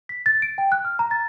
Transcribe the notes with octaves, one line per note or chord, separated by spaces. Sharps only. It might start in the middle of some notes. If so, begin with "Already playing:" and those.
B6
A6
D7
G5
F#6
F6
A#5
A6